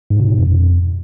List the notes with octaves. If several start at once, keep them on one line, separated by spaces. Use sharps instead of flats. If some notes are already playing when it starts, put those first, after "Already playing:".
G#2
C3
B2
F2